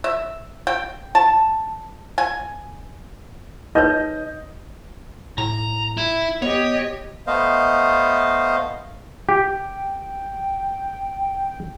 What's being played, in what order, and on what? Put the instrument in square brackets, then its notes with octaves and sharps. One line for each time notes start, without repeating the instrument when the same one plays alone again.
[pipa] E5
G5
A5
G#5
[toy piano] D#4 B4 C#5 [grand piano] D#5 G6
[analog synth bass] A2 [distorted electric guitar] A#5
[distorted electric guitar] E4
[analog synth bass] B3 [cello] G4 D#5 [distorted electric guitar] C#5
[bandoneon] A3 B3 C5 D#5 F5
[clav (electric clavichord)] G4 [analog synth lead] G5